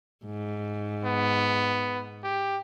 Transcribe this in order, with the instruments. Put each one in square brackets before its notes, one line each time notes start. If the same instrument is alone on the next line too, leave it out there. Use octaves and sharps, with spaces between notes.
[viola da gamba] G#2
[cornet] B3
G4